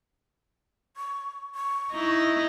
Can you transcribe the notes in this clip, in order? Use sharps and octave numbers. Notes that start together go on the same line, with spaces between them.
C#6
C#6
D#4 E4